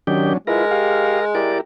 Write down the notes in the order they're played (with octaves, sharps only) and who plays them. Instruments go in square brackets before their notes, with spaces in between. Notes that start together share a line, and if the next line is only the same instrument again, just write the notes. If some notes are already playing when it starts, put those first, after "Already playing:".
[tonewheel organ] D#3 G4 [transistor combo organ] F#3 C#4 D4
[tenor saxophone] G#3 [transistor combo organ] E4 F4 B4 [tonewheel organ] A#4
[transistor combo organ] G4 F5
[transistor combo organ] E4 G4 A#4 [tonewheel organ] D5